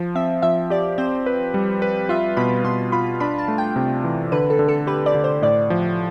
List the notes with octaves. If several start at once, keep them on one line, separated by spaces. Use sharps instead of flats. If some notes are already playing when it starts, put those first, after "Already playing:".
Already playing: F3
C4 E5
F3 E5
G4 D5
C4 C5
B4
G3
B4
F4 E5
B2 B5
B2 C6
F4 B5
D4 B5
A5
A3
G5
C3
E3
D3 B4
A4
D3
A4
G4 B4
D5
D3
C5
A2 D5
F3